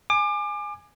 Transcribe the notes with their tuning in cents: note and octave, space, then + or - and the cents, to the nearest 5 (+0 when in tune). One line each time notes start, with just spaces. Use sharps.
G#5 +0 D6 +30